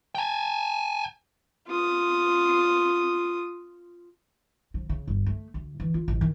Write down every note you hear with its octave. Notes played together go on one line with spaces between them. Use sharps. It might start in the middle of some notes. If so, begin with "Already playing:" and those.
G5 G#5
F4 D#6
F3
C#3
G1
A3
D2
E3
F4
A1
D#3